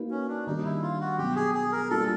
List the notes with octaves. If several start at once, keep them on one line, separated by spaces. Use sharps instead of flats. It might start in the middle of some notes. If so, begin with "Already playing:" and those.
Already playing: A#3 D#4 F#4 B4
C#4
D4
D#3 G3 A#3 D4 D#4 G4
E4
F4
F#4
B2 F#3 B3 G4
G#4
G#4
A#4
G3 A#3 D4 F4 A4